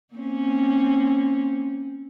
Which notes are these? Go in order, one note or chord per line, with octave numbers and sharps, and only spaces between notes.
A#3 C4 C#4